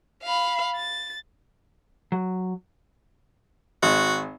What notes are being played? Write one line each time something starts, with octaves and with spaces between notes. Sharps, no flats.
F5 B5
A6
F#3
G#1 F#4